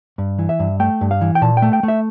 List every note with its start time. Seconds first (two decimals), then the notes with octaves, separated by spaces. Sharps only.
0.18 G2
0.39 E3
0.49 E5
0.60 G2
0.80 A3 G5
1.01 G2
1.11 F5
1.21 E3
1.35 G5
1.42 A#2 A5
1.57 G5
1.62 A3
1.73 G5
1.83 A3
1.88 E5